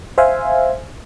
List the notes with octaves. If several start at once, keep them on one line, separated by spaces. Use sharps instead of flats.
C5 E5 F5 G#5